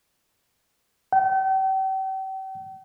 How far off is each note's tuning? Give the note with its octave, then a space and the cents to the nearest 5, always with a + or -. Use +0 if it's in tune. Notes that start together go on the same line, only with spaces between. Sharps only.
G5 -40